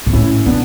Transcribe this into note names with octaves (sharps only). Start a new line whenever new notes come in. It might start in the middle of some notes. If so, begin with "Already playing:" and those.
B2
A2 C#4 E4
B2 B3 D4